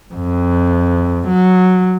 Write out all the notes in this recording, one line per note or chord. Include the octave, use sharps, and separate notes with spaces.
F2
F#3